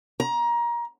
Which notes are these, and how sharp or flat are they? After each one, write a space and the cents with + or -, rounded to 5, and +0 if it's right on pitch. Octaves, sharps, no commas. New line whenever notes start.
A#5 +25